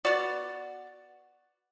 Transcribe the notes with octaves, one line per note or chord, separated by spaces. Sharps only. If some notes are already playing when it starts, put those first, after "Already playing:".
B3 F#4 D5